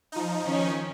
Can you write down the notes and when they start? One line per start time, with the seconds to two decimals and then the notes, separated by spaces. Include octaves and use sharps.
0.12 F3 D#4
0.44 D#3 C#4